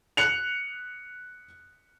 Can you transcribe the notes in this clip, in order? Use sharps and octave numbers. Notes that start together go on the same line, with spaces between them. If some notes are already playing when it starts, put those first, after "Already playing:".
F#6 C#7 F7